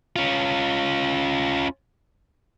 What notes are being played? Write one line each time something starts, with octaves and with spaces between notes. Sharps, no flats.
C#4 F4